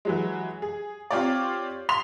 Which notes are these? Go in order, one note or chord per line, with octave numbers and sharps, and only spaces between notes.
E3 F#3 G#3
G#4
C4 F4 G4 C#5 D5
C6 B6 F7